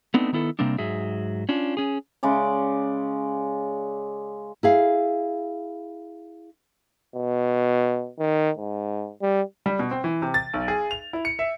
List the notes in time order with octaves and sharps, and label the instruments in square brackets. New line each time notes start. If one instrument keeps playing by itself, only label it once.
[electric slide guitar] A3 B3 C4 D4 D#4
D#3 B3 E4 A4
C3 G3 A#3 C4 D4
G#2 F#3 G#4 E5
C#4 D4 F4
C#4 G#4
[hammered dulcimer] C#3 G#3 D5
[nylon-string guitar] E4 G#4 F5
[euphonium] B2
D#3
G#2
G3
[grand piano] G3
B2
C4
E3
C3
A6
B1
G#4
F7
E4
C#7
E5